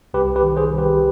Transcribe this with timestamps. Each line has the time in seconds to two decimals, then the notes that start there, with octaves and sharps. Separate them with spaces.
0.14 C2 G4 B4
0.36 G4 B4
0.43 D#3
0.57 G#4 C5
0.71 C2
0.78 G4 B4